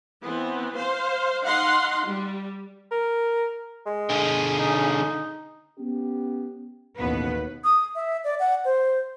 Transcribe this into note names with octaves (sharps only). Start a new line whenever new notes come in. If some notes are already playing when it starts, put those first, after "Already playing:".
E3 B3 C4
C5 F5
D#4 F5 F#5 C6
G3
A#4
G#3
D3 G#4
D#4
B3 C#4 G4
A1 D#2 B2 B3 B4
D#6
E5
D5
F#5
C5